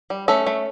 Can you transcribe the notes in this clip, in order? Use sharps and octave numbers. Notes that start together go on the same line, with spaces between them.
G3
A3 C#4 A4
A3